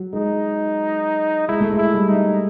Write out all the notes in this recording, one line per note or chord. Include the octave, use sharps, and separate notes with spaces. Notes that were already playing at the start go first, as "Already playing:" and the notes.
Already playing: F#3
G#3 D#4
G#3 E4
A3
G#3
E4
G3
D#4